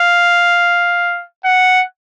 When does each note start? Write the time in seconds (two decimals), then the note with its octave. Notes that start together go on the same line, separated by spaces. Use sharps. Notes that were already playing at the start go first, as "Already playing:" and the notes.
Already playing: F5
1.45 F#5